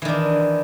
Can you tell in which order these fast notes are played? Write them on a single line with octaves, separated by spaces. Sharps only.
E3 D#3 D4